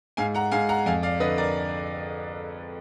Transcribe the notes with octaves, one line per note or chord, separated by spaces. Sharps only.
G#2 F5 G#5
F#5 A#5
G#2 F5 G#5
F#5 A#5
F2 F5 G#5
D5 F5
D3 B4 D#5
A#4 D5